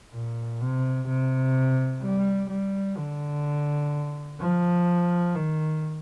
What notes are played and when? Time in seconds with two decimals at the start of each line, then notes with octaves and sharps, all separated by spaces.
0.13 A#2
0.61 C3
1.08 C3
2.02 G3
2.50 G3
2.98 D3
4.40 F3
5.35 D#3